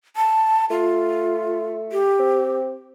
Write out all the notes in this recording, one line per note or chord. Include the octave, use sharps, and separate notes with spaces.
A5
A3 F4
G4
C4